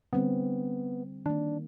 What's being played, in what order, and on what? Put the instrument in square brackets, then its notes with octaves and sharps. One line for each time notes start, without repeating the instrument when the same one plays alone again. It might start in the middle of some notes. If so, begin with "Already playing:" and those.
[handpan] D3 G3 C4 [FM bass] B3
[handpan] D#3 A#3 [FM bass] D4